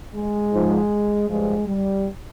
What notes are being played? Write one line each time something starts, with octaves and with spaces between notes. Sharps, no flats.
G#3
G#2 F3
G2 F3 G#3
G3